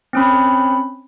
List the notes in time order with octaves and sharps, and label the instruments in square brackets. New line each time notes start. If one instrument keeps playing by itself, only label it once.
[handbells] C4 C#4 B5